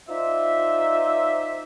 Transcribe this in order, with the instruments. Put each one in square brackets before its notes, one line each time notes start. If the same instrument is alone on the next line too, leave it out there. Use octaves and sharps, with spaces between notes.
[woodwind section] D#4 F4 C5 D5 E5